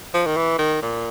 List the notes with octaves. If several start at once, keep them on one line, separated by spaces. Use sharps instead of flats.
F3
D#3
E3
D#3
A#2